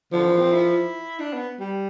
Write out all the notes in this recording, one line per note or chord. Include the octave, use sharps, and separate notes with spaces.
D3 F3
E3
C4
E4
D4
B3
G3